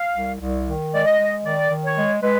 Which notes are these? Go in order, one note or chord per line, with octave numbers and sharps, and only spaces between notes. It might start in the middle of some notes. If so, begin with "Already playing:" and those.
Already playing: F5
C2
C2
D#3
G#3 D5
D#5
G#3
D#3 D5
D#3
C#5
G#3
G#3 B4